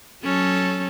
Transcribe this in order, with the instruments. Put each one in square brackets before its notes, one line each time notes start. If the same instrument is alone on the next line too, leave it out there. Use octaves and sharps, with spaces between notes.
[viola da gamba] F#3 C#4 A4